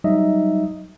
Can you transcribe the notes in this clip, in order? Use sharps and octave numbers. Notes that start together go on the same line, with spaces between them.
F#3 G3 D#4 D#5 E5